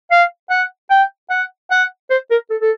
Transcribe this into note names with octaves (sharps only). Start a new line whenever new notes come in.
F5
F#5
G5
F#5
F#5
C5
A#4
A4
A4